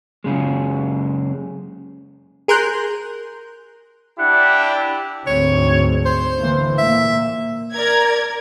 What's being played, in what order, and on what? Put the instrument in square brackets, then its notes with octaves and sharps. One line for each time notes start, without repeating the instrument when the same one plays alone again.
[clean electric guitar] F#2 C#3 G#3
[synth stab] G#4 A#4 C6 F#6 G6
[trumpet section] D4 E4 G4 [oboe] F#5
[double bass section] D2 G#2 C4 [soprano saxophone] C#5
[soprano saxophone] C5
[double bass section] D3 E3 A#3
[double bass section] A#2 A#3 [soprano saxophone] E5
[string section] A#4 D5 G#6